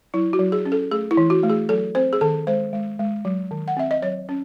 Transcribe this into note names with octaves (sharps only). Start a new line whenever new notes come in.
F#3 E4
F#4
F#3
G#4
C#4
A4
A3 G#4
E4
E3
F#4
A3
G#4
F#3 A4
C4 C5
G#4
D#3 A4
G#3 C5
G#3
G#3
F#3
D#3
F#5
C4 E5
D#5
F#3 C#5
C#4